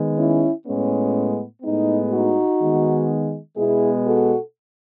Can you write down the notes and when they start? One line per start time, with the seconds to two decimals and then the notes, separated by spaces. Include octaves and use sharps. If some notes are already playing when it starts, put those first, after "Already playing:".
Already playing: D#3 G#3 B3
0.17 C#4 E4
0.65 A2 G#3 B3 C#4
1.62 A2 G#3 B3 D#4
2.11 D#4 F#4
2.59 D#3 G#3 B3
3.56 B2 G#3 B3 E4 G#4
4.05 F#4 A4